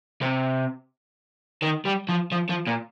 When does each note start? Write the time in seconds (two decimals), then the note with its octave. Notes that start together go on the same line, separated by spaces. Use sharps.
0.22 C3
1.62 D#3
1.85 G3
2.09 F3
2.32 F3
2.49 F3
2.67 A#2